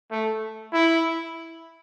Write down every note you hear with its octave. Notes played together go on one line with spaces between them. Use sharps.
A3
E4